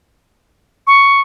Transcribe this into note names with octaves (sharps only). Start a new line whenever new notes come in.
C#6